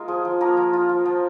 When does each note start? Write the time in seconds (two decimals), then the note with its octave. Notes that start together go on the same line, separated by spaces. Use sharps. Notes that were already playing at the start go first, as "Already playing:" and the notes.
Already playing: G#3 A#3 F4 A#4
0.08 F3 G#4
0.25 F3
0.41 F3 A#3 A#4
0.57 F3
0.73 F4
0.89 F3
1.05 F3